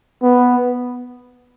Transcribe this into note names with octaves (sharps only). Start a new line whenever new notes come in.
B3